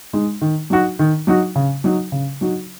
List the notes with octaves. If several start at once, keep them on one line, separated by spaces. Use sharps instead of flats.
G#3 D#4
D#3
F#3 D#4 F#4
D#3
F#3 D#4 F#4
C#3
F#3 D#4 F#4
C#3
F#3 D#4 F#4